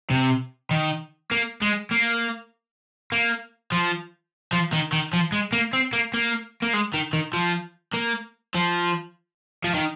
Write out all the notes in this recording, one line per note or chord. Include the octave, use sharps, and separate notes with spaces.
C3
D#3
A#3
G#3
A#3
A#3
F3
F3
D#3
D#3
F3
G#3
A#3
C4
A#3
A#3
A#3
G#3
D#3
D#3
F3
A#3
F3
F3
D#3